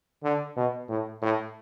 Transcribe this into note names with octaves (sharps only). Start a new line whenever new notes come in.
D3
B2
A2
A2